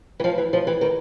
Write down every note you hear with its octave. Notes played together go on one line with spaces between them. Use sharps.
E3
F3
E3
F3
E3
D#3